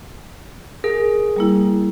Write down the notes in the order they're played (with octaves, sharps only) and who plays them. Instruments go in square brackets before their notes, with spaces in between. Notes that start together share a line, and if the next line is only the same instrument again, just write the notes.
[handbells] G#4 [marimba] A#4
[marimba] G3 A#3 E4